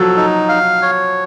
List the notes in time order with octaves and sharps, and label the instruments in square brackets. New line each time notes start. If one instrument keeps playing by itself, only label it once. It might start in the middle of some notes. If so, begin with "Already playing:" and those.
Already playing: [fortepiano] F3 F#3 [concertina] A4
[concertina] D#4
F5
C#5